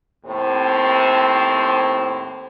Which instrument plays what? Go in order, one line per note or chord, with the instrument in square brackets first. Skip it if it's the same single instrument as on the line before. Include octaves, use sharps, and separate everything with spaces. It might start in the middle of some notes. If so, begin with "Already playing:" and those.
[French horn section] D#2 A2 C4 C5